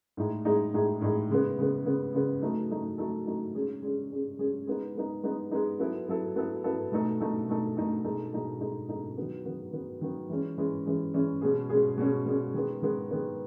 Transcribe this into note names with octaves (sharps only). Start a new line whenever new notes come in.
A2 G#3 D#4 G#4
A2 G#3 D#4 G#4
A2 G#3 D#4 G#4
A2 G#3 D#4 G#4
C#3 G#3 B3
C#3 G#3 B3
C#3 G#3 B3
C#3 G#3 B3
F#3 A3 D#4 A4
F#3 A3 D#4 A4
F#3 A3 D#4 A4
F#3 A3 D#4 A4
G#3 C#4 G#4
G#3 C#4 G#4
G#3 C#4 G#4
G#3 C#4 G#4
G#3 B3 D#4
G#3 B3 D#4
G#3 B3 D#4
G#3 B3 D#4
F#3 B3 E4 A4
F#3 B3 E4 A4
F#3 B3 E4 A4
F#3 B3 E4 A4
B2 A3 D#4 A4
B2 A3 D#4 A4
B2 A3 D#4 A4
B2 A3 D#4 A4
B2 G#3 D#4 A4
B2 G#3 D#4 A4
B2 G#3 D#4 A4
B2 G#3 D#4 A4
D#3 F#3 B3
D#3 F#3 B3
D#3 F#3 B3
D#3 F#3 B3
E3 G#3 C#4
E3 G#3 C#4
E3 G#3 C#4
E3 G#3 C#4
B2 G#3 C#4 G#4
B2 G#3 C#4 G#4
B2 G#3 C#4 G#4
B2 G#3 C#4 G#4
D#3 G#3 B3
D#3 G#3 B3
D#3 G#3 B3